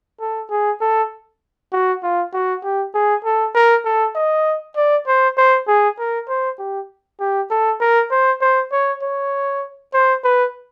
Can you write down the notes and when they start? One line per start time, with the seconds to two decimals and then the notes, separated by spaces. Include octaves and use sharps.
0.20 A4
0.50 G#4
0.81 A4
1.72 F#4
2.03 F4
2.33 F#4
2.63 G4
2.94 G#4
3.24 A4
3.55 A#4
3.85 A4
4.15 D#5
4.76 D5
5.07 C5
5.37 C5
5.67 G#4
5.98 A#4
6.29 C5
6.59 G4
7.20 G4
7.50 A4
7.80 A#4
8.11 C5
8.41 C5
8.72 C#5
9.02 C#5
9.93 C5
10.24 B4